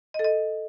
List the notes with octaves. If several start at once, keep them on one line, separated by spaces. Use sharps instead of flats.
D#5
A4
D#5